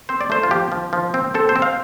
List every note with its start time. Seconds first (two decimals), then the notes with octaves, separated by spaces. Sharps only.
0.09 C4 C5
0.21 D5
0.30 A3 C5
0.43 F4
0.51 F3 G4
0.72 F3
0.93 F3
1.14 C4
1.34 C4 A4
1.49 C5
1.56 C4
1.62 F5